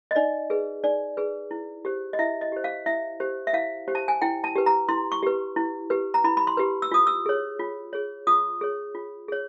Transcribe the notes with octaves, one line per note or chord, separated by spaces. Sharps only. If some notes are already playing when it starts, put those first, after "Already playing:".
D#5
D#4 D5
G#4 B4
D#4 D5
G#4 B4
E4
G4 C5
D#5
E4 E5
D#5
G4 C5
F5
E4 E5
G4 C5
E5
E4 F5
G4 C5
A5
G#5
E4 G5
A5
G4 B4
A#5
E4 C6
C#6
G4 B4
E4
G4 B4
A#5
E4 B5
B5
C6
G4 B4
E6
F4 D#6
E6
G#4 C#5
F4
G#4 C#5
F4 D#6
G#4 C#5
F4
G#4 C#5